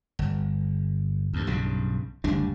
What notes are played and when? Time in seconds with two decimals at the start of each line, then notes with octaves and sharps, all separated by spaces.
0.19 G1
1.33 D2 G2
1.47 B1 G2 C#3
2.24 F#1 D2 G3 D4